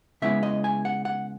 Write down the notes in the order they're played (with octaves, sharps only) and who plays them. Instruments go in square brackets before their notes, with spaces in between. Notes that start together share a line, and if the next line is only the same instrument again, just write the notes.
[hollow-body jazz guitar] C#3 G#3 B3 E4 E5
D#5
G#5
F#5
F#5